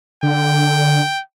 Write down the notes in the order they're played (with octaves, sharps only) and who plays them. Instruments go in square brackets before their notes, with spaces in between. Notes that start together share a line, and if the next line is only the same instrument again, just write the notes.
[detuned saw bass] D3 [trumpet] G5